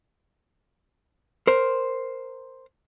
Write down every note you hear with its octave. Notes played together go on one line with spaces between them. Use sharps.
A#4 C5